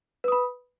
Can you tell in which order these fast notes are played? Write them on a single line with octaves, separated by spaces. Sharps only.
B4 D#6 B5